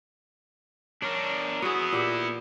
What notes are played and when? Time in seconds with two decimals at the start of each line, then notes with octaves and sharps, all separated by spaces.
1.02 D4 A#4 C#5
1.62 B3 E4 F#4 G#4
1.93 A#2 G4 E5